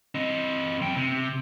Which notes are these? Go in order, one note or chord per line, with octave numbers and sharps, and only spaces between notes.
C4 D#5
F#2 G5
C3